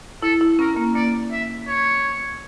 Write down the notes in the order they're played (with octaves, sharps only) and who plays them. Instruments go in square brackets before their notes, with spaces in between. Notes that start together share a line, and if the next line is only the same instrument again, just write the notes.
[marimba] E4 [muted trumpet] A4
[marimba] E4
[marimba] C#4 [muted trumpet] A#4
[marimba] A#3
[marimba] A#3 [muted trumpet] D5
[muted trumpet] E5
C#5